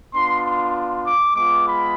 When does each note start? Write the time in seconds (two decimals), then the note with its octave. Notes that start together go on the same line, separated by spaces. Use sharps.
0.14 B3 D4 F4 C6
0.44 C6
0.75 C6
1.05 D6
1.35 G#3 B3 F4 D6
1.66 B5